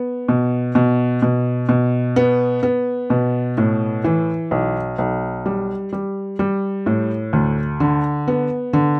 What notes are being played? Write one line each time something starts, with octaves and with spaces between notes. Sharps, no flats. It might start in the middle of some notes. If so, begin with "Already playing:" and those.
Already playing: B3
B2
B2
B2
B2
B3
B3
B2
A2
E3
B1
B1
G3
G3
G3
A2
D2
D3
B3
D3